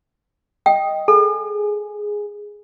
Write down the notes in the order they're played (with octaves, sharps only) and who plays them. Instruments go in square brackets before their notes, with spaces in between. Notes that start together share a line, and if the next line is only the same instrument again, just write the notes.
[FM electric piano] D#5 [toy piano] G5
[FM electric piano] G#4 [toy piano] A4